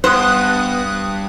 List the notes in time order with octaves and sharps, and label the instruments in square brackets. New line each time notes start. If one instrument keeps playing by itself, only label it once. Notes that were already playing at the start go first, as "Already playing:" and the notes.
[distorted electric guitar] G2 [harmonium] B3 [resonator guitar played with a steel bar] C5 [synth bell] D#6 F#6